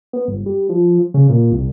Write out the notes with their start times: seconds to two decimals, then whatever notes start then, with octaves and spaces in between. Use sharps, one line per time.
0.13 B3
0.28 G1
0.46 G3
0.69 F3
1.14 C#3
1.29 A#2
1.52 C2